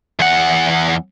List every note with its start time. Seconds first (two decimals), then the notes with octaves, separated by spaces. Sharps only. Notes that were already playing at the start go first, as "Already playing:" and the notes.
0.20 E2 F#5